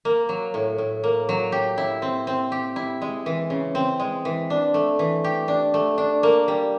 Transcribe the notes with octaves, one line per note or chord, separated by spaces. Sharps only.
A#3
F#3
A2
A2
A#3
F#3
G4
E4
C4
C4
G4
E4
G#3
E3
C#3
C4
G#3
E3
D4
A3
E3
G4
D4
A3
D4
A#3
G3